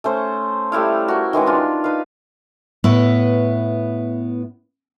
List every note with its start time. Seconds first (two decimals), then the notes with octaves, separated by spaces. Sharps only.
0.04 A3 C#4 C5
0.72 G3 A3 E4 F5
1.08 F#4 A#4
1.33 D#3 E3 G#3 C#4
1.46 D4 F4
1.84 D#4 B4 F5
2.84 A2 B3 E4 B4